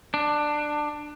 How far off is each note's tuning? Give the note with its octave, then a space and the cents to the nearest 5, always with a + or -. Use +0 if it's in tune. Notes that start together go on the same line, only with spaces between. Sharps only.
D4 +15